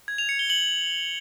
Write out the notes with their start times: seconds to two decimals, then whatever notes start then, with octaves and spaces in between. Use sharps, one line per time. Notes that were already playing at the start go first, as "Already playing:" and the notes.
0.08 G#6
0.18 F7
0.29 C#7
0.39 G7
0.50 F#7